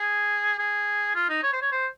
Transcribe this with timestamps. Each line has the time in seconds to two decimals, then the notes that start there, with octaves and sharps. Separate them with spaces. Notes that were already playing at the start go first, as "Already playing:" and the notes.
Already playing: G#4
0.59 G#4
1.15 F4
1.29 D#4
1.43 C#5
1.53 C5
1.62 C#5
1.72 C5